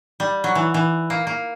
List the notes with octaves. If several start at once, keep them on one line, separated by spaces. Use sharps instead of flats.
G3
F#3
E3
E3
A#3
A#3